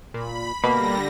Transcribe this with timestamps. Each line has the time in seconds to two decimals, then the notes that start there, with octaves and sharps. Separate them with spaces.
0.14 A#2 B5
0.64 B2 D3 G3 A#3 B5 A#6